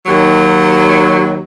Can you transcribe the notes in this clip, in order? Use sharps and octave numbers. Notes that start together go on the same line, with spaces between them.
D#2 F#3